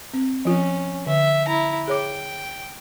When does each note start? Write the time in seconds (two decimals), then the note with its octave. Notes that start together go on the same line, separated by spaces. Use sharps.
0.13 C4
0.45 F3 C#4 F4
1.07 D3 E5
1.48 E4 A#5
1.88 G#4 C#5 G5 D6